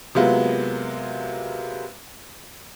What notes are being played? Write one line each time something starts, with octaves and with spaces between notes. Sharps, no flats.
C3 F#3 G#3 A#3 B3 F4